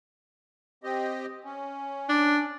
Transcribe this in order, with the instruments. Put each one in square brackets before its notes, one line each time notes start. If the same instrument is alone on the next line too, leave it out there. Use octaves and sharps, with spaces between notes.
[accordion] C4 G4 D#5
C#4
[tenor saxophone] D4